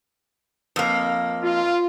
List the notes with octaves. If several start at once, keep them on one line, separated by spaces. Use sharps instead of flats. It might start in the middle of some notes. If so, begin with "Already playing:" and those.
F2 A#3
F4